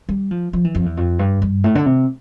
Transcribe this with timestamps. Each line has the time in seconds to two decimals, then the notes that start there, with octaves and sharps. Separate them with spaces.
0.09 G3
0.31 F3
0.53 F3
0.64 E3
0.75 F2
0.86 E2
0.97 F2
1.19 G2
1.42 G2
1.64 A2
1.75 D3
1.86 C3